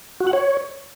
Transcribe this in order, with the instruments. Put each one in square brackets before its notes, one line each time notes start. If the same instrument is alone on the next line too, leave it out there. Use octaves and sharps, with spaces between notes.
[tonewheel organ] F#4
F#5
C#5